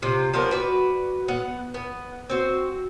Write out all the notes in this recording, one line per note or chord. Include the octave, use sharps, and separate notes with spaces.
C3 F4
F3 B3 D4 A#4
F#4 B4 D5
B3 F#5
B3
C4 F#4